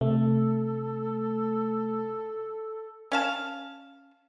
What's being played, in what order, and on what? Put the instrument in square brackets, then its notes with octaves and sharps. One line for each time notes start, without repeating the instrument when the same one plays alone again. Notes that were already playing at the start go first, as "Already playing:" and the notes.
[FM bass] C3 [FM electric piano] A3 [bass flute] A4
[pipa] C#4 F5 A5